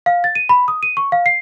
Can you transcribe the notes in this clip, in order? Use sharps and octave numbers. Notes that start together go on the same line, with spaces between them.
F5
A6
D#7
B5
D#6
D#7
C#6
F5
C7